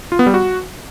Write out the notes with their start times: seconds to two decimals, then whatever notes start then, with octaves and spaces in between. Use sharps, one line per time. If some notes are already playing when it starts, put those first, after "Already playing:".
0.12 F4
0.19 B3
0.26 G3
0.34 F#4